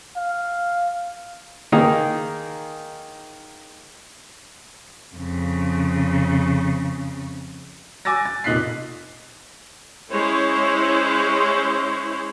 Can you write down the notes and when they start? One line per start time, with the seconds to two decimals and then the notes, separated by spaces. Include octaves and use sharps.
0.17 F5
1.72 D#3 A#3 D#4 G#4 D#5 A#5
5.16 F2 C#3
8.05 G#5 D6 E6 A6 A#6
8.25 A6
8.44 F1 A#2 D#4 F#6 B6 C7
10.11 G#3 C#4 E4 C5 C#5